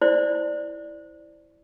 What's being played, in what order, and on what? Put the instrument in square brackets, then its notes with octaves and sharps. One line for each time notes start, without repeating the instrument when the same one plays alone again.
[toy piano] E4 C5 D5